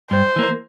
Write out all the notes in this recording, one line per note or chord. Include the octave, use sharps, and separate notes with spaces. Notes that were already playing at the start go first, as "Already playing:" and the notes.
G2 C5
E3 A#3